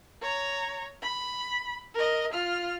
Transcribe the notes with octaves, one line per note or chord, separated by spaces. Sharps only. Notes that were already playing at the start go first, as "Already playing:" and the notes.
C#5 A#5
B5
A#4 D#5
F4 F6